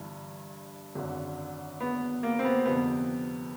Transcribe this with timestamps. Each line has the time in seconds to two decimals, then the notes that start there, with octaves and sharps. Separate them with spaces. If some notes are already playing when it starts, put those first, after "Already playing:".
Already playing: G1 G2 E3
0.95 G#1 F#2 D3
1.80 B3
2.23 A#3
2.39 C4
2.44 B3
2.65 G1 F2 C3 B3